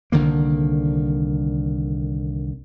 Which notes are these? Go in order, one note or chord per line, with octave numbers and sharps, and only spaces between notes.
C2 D3 D#3 A#3